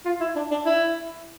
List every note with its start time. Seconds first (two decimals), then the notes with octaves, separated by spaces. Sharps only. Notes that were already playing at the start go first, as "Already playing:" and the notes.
0.05 F4
0.21 E4
0.36 D4
0.51 D4
0.66 E4